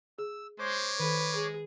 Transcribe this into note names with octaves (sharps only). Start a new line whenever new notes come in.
G#4 E6
G#3 C5 C#5 D6
D#3 A4 B4
G#4